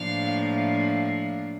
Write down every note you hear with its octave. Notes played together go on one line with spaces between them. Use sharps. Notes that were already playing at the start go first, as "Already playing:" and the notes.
Already playing: A2 F3 A#3 D4 F5